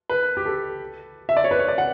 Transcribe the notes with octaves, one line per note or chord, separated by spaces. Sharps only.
B4
G4
A4
E5
D5
C#5
B4
C#5
D5
F#5